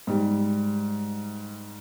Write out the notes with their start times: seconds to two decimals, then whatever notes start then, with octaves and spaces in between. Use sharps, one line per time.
0.07 G#2 G3